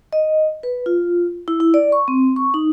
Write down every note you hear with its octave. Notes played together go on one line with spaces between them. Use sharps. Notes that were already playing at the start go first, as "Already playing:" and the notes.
D#5
B4
F4
E4
E4
D5
C#6
C4
C#6
D#4